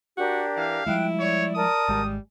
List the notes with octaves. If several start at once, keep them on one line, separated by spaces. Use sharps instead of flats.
D4 F#4 G4 A#4
E3 F5
F3 G3 G#3 E4 G5 F#6
C#5 D5
A#4 D5 A5 D#6
G#1 G3 G#3